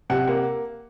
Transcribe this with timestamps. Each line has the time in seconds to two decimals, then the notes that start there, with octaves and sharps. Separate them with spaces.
0.10 C3 F#5
0.28 A#3 F#5